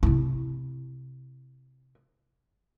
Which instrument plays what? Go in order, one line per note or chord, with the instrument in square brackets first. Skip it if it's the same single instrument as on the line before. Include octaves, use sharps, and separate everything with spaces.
[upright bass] C3 E4